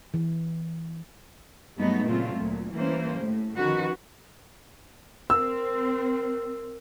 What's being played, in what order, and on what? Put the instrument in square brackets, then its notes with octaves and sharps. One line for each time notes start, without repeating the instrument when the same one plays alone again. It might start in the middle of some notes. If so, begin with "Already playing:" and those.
[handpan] E3
[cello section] G2 F#3 G#3 A3 B3 D#4
A#2 C#3 F#3 A3 C4 F4
D2 A#2
E3 G3 A#3 C#4 C5
A2
D#3 F3 C#4 F#4 B4
[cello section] C4 [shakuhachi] A#4 [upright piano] E6